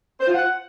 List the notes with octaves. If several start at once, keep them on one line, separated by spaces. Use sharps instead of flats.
C5
F4
F#5